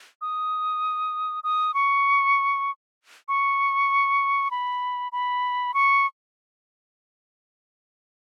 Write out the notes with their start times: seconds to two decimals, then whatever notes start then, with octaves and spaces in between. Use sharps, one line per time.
0.21 D#6
1.44 D#6
1.74 C#6
3.28 C#6
4.51 B5
5.12 B5
5.74 C#6